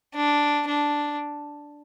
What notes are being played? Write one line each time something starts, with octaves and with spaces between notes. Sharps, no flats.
D4
D4